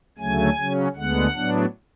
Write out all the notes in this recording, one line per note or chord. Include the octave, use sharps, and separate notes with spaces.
D2 C#3 F#3 A3 G#5
C#3 F#3 C#4
D2 D3 G#3 B3 F#5
A2 F#3 B3 D4